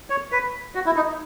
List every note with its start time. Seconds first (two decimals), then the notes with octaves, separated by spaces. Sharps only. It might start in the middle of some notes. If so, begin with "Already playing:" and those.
0.10 C#5
0.32 B4
0.75 F#4
0.86 E4
0.96 D#4